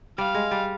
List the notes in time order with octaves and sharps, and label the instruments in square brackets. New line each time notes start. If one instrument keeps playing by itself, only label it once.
[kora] G3 [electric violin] F5
[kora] G#3
G3